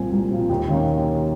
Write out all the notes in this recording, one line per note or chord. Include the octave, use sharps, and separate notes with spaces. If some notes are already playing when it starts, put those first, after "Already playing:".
Already playing: C2 A#2 F3 C4 G#5
C2
A#2 F3 C4
D#2
D#3 A#3 C#4